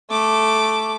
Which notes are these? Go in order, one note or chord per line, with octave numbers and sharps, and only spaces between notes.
A3 D6